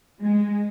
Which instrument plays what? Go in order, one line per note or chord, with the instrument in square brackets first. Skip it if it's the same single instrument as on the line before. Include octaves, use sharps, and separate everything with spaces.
[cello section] G#3